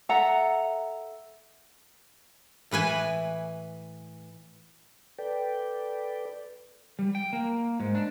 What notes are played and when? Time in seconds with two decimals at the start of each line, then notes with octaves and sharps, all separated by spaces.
0.09 A4 E5 F#5 A#5
2.71 A2 E3 B4 G#5
5.19 A4 B4 D5 G5
6.99 G3
7.15 G5
7.33 A#3
7.80 G#2
7.95 D4